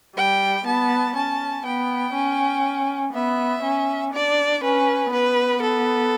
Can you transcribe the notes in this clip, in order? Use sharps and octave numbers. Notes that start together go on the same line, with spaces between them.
G3 G5
B3 A5
C#4 A5
B3 G5
C#4
B3 E5
C#4
D4 D5
C#4 B4
B3 B4
A4